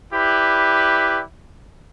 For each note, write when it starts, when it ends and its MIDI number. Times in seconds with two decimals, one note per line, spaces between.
0.13 1.22 64
0.13 1.22 67
0.13 1.22 71
0.13 1.22 74